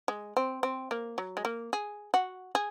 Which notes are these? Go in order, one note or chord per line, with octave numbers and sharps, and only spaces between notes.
G#3
C4
C4
A#3
F#3
G#3
A#3
G#4
F#4
G#4